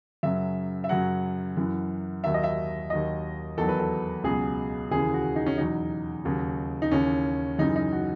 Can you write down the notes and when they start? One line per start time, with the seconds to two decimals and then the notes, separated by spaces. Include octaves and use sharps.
0.23 F#2 C#3 F#3 E5
0.84 E5
0.89 F#2 C#3 F#3 F#5
1.57 F#2 E3
2.24 D#2 D#3 F#3 E5
2.34 D#5
2.43 E5
2.90 D#2 D#3 F#3 D#5
3.57 E2 D#3 F#3 A4
3.69 B4
3.80 A4
4.24 C#2 B2 F#3 G#4
4.91 D#2 C#3 E3 G#4
5.14 F#4
5.36 D#4
5.46 C#4
5.58 E2 B2 F#3 D#4
6.25 D#2 C#3 F#3
6.82 D#4
6.91 D#2 C#3 E3 C#4
7.59 F#2 C#3 E3 D#4
7.76 D#4
7.92 F#4